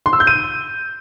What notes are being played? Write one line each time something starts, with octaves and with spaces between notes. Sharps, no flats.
C6
E6
G6
D#7